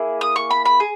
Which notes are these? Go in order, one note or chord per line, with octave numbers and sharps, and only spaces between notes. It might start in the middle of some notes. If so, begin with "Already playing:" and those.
Already playing: A#3 E4 G#4
D#6
C#6
B5
B5
G#4